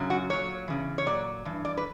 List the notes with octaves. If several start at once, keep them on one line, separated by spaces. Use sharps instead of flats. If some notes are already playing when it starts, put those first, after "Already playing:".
Already playing: F#2 C#3 F#3
F#4
A#2 F#3 C#5
E2 C#3 E3
C#5
A#2 F#3 D5
G2 E3
D5
B4